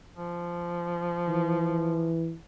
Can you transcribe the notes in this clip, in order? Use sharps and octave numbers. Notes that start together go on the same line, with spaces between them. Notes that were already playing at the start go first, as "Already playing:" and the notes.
F3
E3